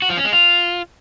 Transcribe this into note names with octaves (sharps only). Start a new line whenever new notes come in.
F#4
F3
C#4
G#3
F4